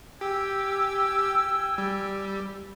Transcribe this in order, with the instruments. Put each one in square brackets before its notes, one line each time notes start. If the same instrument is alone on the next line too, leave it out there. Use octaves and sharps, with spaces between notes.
[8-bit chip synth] G4 [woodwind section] G5 G#5 E6
[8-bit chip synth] G3